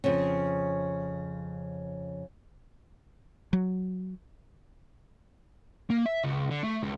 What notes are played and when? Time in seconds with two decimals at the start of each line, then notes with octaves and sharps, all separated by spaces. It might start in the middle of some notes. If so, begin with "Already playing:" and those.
0.04 F2 C#3
3.53 F#3
5.90 A#3
6.06 E5
6.24 C#2
6.51 D3
6.64 A3
6.83 C#2